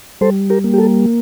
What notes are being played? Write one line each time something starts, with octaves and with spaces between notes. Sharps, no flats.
G3 A4 C5
G4 A#4
A#3
G4
A4